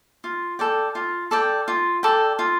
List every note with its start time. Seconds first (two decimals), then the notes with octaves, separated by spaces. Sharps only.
0.24 F4
0.59 A4 D5 G5
0.95 F4
1.31 A4 D5 G5
1.68 F4
2.03 A4 D5 G5
2.39 F4